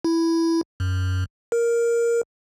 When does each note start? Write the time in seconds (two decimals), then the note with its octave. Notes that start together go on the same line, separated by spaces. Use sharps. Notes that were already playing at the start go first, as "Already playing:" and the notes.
0.04 E4
0.80 F#2
1.52 A#4